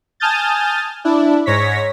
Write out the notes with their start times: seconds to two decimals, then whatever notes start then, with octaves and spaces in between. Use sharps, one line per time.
0.20 G#5 A5 D#6 F6 G6 A6
1.04 D4 E4
1.46 G#2 C#5 A#6 B6